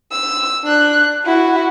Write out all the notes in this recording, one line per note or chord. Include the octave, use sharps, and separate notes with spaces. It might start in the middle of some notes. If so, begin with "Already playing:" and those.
E6
D4 F#6
E4 F#4